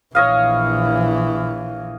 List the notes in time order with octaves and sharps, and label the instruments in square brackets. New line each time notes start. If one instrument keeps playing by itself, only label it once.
[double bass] A#1 E3 [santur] C#5 D#5 F5